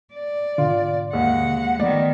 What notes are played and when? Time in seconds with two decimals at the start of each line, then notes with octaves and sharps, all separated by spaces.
0.14 D5
0.58 G#2 B2 D3 F4
1.13 D#2 G#3 F#5
1.80 D#3 F3 A3 B3 D5